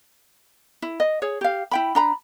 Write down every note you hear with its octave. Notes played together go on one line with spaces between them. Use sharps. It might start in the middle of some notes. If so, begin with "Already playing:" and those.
E4
D#5
G#4 C#5
G4 F5
E4 G5 B5
D4 A#5 B5